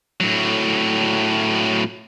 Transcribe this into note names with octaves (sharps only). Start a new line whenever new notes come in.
A2 F#3